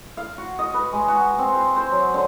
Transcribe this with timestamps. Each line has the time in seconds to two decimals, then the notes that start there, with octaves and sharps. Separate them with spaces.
0.17 F5
0.38 F#4
0.59 D#5
0.74 B4
0.93 G#3
1.08 F#4
1.39 C4
1.55 C5
1.76 C5
1.92 F#3
2.14 D3